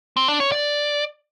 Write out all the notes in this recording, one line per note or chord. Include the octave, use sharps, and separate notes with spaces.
C4
D4
C#5
D5